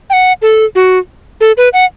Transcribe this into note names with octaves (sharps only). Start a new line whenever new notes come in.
G5
F#5
A4
F#4
A4
B4
F#5